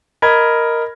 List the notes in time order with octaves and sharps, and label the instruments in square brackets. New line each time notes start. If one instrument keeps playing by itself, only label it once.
[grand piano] A#4 D#5 B5 G#6